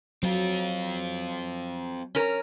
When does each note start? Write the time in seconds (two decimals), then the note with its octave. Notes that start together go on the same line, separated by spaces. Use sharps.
0.23 F#3 C4 F4
2.15 C#4 A#4